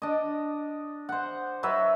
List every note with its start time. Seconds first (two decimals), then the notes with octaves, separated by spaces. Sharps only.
0.02 D4 D#5
1.09 C5 F#5
1.63 F#3 B4 E5